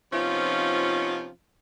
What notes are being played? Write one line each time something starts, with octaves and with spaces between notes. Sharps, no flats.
C3 F3 B3 C#4 D#4 F4